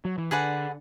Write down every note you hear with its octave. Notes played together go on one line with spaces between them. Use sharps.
F#3
E3
D3 G#4 B4 D5 F#5